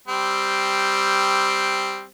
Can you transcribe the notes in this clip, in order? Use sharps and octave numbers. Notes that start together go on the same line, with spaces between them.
G3 C4